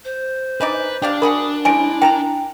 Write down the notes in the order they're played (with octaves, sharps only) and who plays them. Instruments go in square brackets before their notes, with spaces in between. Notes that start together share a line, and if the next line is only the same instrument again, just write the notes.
[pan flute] C5
[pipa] E3 D#4 D5 [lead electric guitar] B4
[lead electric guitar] D4 [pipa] G4 D5 F5
[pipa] F#4 G#4 B5 [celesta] A#4 [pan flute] D#6
[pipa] G3 G#3 C#4 [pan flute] E4 [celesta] G#5 D7
[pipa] A#4 A5 A#5 [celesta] G5